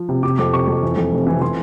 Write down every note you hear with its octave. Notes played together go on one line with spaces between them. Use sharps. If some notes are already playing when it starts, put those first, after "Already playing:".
Already playing: F3
C3
C3 D6
F2 D6
C3 C#6
F2
E3
F2
F1
E3
E3 C6